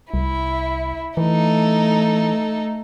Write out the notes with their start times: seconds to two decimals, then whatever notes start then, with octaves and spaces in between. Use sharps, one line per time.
0.14 C2 E4
1.17 E3 A3 D#4 A4